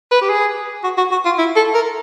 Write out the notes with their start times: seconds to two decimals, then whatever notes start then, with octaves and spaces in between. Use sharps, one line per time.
0.11 B4
0.21 G4
0.30 G#4
0.84 F#4
0.97 F#4
1.12 F#4
1.25 F4
1.38 E4
1.56 A4
1.74 A#4